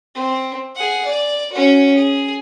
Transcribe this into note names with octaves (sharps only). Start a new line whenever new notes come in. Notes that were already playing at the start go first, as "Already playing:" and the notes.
C4
G#4 F#5
D5
C#4 F#4
G#4